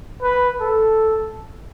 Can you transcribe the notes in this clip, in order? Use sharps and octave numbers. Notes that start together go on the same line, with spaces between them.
B4
A4